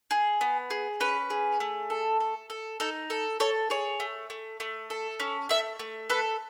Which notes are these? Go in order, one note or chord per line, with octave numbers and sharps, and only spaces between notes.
G#4
B3
G#4
C#4 B4
G#4
A3
A4
A4
A4
D#4 A4
A4
A4 C#5
G#4 C#5
A3
A3
A3
A4
C#4
A3 E5
A3
A4 B4